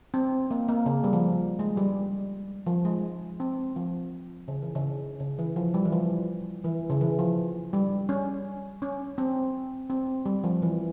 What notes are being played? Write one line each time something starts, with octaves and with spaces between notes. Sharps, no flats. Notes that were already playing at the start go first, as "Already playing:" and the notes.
C4
A#3
A#3
C#3
G3
F3
G#3
G3
F3
G#3
C4
F3
C#3
E3
C#3
C#3
E3
F3
G3
E3
F3
E3
C#3
E3
F3
G3
C#4
C#4
C4
C4
G3
F3
E3